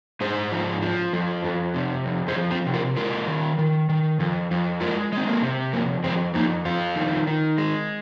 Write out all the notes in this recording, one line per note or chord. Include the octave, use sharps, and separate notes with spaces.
G#2 G#4 C5
F3
F3
F2
F2
C3
F2
G#4 C5
F3
C4 F4
C3
F4 A#4
G#3 F4 A#4
D#3
D#3
D#3
F2
F2
G#3 F4 A#4
G#3 C4
A#3
C3
F2 A#3
F2 G#3 C4
F2 A#3 D#4
F2 C4 F4
D#3
D#3
G#3